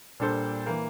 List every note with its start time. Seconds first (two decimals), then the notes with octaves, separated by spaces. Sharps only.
0.20 A#2 G3 D4 A4 C5
0.66 E3 A#3